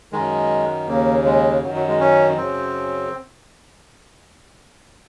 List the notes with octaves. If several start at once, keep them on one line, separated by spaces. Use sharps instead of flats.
F#2 D#3 G#3
D#2 C#3 A#3
G#3
F#2 D#3 F#3
F#3
G#3
C#4
F#2 C#3 C4